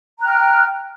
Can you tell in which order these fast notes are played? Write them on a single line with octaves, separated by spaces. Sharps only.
A#5 F#6 G5 F6